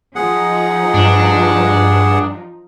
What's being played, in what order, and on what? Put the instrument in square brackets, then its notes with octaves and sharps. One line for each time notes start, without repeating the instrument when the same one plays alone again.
[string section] F3 D#4 [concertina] G#4 F#5
[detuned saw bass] G2 [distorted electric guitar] D4